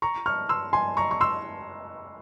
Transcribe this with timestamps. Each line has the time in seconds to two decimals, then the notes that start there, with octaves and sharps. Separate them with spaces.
0.02 A#5 C#6
0.26 C#6 F6
0.49 C6 E6
0.73 G#5 C6
0.97 A#5 C#6
1.11 C#6
1.21 C6 E6